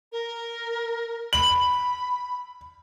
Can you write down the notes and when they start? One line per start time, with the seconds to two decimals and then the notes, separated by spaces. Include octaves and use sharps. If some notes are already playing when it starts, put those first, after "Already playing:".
0.12 A#4
1.33 B5 F#7